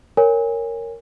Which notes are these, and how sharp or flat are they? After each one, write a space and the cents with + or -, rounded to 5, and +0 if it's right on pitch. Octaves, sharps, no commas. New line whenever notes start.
A#4 -10 C#5 +0 G#5 -30